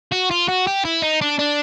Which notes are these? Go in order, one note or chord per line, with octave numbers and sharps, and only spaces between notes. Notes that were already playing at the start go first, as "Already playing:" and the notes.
F#4
F4
F#4
G4
E4
D#4
D4
D4